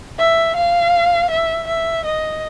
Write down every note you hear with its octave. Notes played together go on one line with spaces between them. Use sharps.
E5
F5
E5
E5
D#5